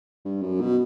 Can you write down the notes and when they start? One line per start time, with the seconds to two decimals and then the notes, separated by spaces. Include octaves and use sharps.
0.25 G2
0.42 F#2
0.61 B2